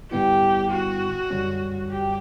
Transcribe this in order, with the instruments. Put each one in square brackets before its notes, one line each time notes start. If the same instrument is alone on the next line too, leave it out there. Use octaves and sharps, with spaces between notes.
[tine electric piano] G2 D3 G3 B3 E4 [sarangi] G4
[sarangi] F#4
[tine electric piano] G1 F#2 D3 G3 C#4
[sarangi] G4